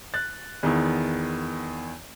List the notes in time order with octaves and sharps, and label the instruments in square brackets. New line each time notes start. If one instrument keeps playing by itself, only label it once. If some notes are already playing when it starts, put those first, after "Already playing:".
[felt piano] F#6 A6
E2 D#3 B3 E4